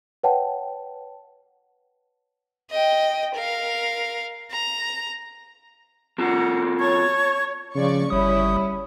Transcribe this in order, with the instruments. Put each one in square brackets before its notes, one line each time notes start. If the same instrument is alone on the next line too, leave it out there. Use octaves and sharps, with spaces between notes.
[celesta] B4 C#5 F#5 G5 A5
[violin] D#5 G5
A#4 F5
A#5
[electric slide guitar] C4 F4 F#4 [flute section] F#5 A#5
[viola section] C#5 [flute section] A5 C#6 G#6
[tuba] C#3 [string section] F3 D5 C#6
[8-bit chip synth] G1 D#6 [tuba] G3 [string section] C#4 E4